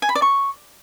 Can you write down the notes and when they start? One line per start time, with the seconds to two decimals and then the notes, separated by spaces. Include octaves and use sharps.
0.02 G#5
0.09 B5
0.15 D5
0.22 C#6